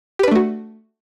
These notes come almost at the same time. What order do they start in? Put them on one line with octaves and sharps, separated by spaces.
G4 B4 D4 A3 F#4